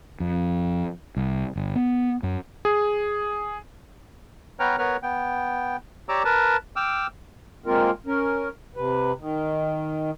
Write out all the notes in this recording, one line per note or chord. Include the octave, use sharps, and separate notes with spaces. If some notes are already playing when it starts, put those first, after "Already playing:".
F2
C2
G1
B3
F#2
G#4
B3 B4 C#5 G5 A#5 F6
B3 A#4 B4 C#5 F6
B3 G5
G4 C#5 D5 A#5 D6 E6
A#4 B4 A5
G5 D6 E6 F6
G#3 A#3 C4 F4 A#4
C#4 A#4
C3 B4
D#3